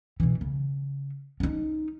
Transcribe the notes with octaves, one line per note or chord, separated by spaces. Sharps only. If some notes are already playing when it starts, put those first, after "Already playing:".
B2 E3
C#3
C#4 D#4